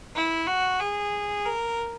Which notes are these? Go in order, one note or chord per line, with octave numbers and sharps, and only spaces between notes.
E4
F#4
G#4
A#4